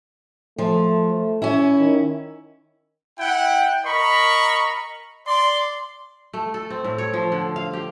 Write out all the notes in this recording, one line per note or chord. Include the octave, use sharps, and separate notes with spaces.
F3 A3
C#4 E4
D#3
E4 F#5 G5
A#4 D#5 A#5 B5 C#6
D5 C6
A3
A4
C4
A2
C#5
F3
D3
F5
G4